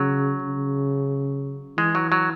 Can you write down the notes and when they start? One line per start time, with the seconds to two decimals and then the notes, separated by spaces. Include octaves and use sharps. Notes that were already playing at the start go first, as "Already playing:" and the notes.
Already playing: C#3 F#3
0.41 C#3
1.77 E3 G#3
1.95 F#3
2.12 F#3